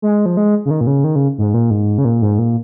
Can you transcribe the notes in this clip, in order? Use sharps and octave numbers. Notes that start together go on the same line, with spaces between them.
G#3
F3
G#3
C#3
D#3
A#2
C#3
D#3
C#3
G#2
A#2
G#2
C#3
A#2
G#2
A#2